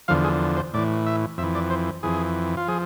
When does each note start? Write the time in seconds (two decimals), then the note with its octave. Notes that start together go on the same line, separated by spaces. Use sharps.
0.08 E2 D3 F3 F5
0.24 G#4
0.57 C5
0.74 A2 E3 D5
1.06 E5
1.38 F2 E5
1.43 E3
1.55 D5
1.70 C5
2.03 F2 E3 G#4
2.57 F4
2.68 F3 G#4